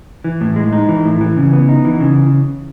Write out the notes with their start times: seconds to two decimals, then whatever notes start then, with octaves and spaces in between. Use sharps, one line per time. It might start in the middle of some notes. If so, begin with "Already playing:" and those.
0.24 E3
0.41 A2
0.56 G#3
0.73 D#4
0.89 E3
1.05 A2
1.21 E3
1.37 C#3
1.53 B3
1.69 D#4
1.85 E3
2.01 C#3